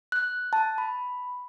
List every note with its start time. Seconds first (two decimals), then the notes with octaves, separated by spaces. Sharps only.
0.12 F#6
0.53 A5
0.78 B5